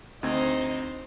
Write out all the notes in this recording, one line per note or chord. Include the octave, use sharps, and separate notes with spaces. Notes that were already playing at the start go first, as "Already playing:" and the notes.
D2 C4 D#4 C5 G#6